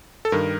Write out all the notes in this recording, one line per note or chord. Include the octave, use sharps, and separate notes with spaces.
A4
G2 D#3 A#4